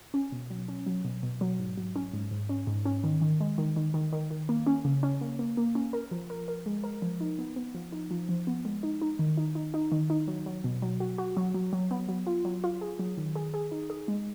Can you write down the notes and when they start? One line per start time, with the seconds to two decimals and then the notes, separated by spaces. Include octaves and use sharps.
0.14 C#4
0.32 B2
0.50 F#3
0.68 C#4
0.87 F#3
1.05 B2
1.23 B2
1.41 F#3
1.59 G#2
1.78 F#3
1.96 C#4
2.14 G#2
2.31 G#2
2.49 C#4
2.67 G#2
2.85 C#4
3.04 D#3
3.22 D#3
3.40 G#3
3.58 D#3
3.76 D#3
3.94 D#3
4.12 D#3
4.30 D#3
4.49 A#3
4.67 C#4
4.85 C#3
5.03 C#4
5.21 A#3
5.39 A#3
5.57 A#3
5.75 C#4
5.93 A#4
6.11 F3
6.30 A#4
6.48 A#4
6.66 G#3
6.84 A#4
7.02 F3
7.20 D#4
7.39 B3
7.56 B3
7.75 F3
7.92 D#4
8.11 F3
8.29 F3
8.47 B3
8.65 G#3
8.83 D#4
9.02 D#4
9.19 D#3
9.37 D#4
9.55 D#4
9.74 D#4
9.92 D#3
10.10 D#4
10.28 F#3
10.46 F#3
10.64 B2
10.82 F#3
11.00 F#4
11.18 F#4
11.37 F#3
11.54 F#3
11.73 F#3
11.91 B3
12.09 F#3
12.27 F4
12.45 F#3
12.64 F4
12.81 G#4
12.99 F#3
13.17 D#3
13.36 G#4
13.54 G#4
13.72 D#4
13.90 G#4
14.08 G#3